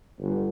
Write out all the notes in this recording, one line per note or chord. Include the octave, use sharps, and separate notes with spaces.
G1